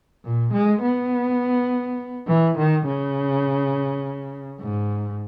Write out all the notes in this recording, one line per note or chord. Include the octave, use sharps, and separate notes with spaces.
A#2
G#3
B3
E3
D#3
C#3
G#2